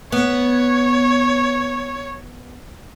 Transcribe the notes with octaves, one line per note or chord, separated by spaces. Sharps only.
B3 C#5